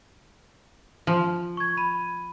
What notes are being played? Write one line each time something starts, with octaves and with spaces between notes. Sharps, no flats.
F3
C#6 G#6
B5 D#7